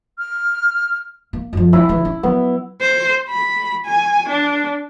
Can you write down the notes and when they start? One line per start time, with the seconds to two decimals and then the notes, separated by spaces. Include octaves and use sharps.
0.18 F6
1.33 A#3
1.53 F#2 F3
1.73 C2 E4
1.89 C#3 E3
2.05 C#4
2.23 F#3 B3
2.81 C5
3.29 B5
3.85 G#5
4.28 D4